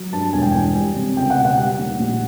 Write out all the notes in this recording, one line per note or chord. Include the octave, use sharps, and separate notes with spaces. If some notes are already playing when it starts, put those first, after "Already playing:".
Already playing: F#3
G2 A5
E1 G#5
G5
E2 G#5
G3
C3
C#2 G5
F#5
B2
F#5
G3 F#5
D#2
A#1